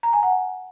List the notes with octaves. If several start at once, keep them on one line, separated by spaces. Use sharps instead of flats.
A#5
G#5
F#5